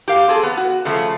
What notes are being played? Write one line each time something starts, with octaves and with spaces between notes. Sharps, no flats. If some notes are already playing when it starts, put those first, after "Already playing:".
G4 A#4 F5
C4 G#4 A4
B3
F#4
C#3 F3 A3